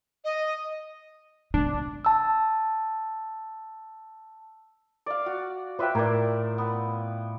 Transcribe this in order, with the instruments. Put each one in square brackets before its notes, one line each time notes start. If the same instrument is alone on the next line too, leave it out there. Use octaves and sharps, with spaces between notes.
[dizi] D#5
[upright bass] C3 [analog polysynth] D4
[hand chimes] A5 E6
[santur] D5 F5
F#4
[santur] F4 E5 G5 [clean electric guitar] B4
[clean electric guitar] A2 [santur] A#4 D5
[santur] B3